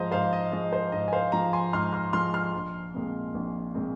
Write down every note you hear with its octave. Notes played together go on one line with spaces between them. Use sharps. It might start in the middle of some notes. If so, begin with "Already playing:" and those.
Already playing: G#2 F3 G#3 C5 D#5 F5 A#5
G#2 C5 F5
D#5
F3 G#3 D#5
C5
G#2 D#5
G#5
C5 F5
F3 G#3 F5 A#5
G#5 C6
G#2 C6 F6
C6 F6
F3 G#3 C6 F6
C6 F6
A#1
A#2 G#3 C4
A#1
A#2 G#3 C4